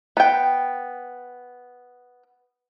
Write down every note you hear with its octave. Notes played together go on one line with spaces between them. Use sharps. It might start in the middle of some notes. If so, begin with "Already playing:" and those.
B3 G5